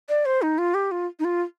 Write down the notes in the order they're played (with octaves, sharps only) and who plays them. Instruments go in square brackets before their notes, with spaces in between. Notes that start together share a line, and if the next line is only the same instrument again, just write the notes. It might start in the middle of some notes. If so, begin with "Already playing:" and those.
[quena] D5
C5
D#4
F4
G4
F4
D#4
F4